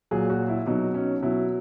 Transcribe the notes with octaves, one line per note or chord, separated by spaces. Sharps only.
A#2 F#3 G#4
F#4
E4
B2 F#3 D#4
C#4
B2 F#3 E4